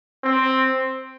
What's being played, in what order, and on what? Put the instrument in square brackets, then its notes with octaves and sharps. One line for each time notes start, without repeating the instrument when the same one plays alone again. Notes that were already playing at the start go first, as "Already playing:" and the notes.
[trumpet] C4